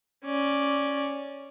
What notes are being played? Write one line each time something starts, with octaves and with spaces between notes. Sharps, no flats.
C#4 D5